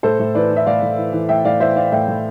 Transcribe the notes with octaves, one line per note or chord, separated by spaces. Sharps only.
A2 A4 C5
A2
E3 B4 D5
E3
E5
A2 D5 F5
A2
E3
E3
A2 E5 G5
A2 D5 F5
E3 C5 E5
E3 D5 F5
A2 E5 G5
A2